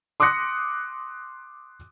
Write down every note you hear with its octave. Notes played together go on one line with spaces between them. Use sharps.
C6 D6 D#6 F#6 A#6 C#7